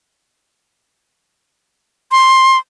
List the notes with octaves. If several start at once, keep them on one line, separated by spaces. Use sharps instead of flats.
C6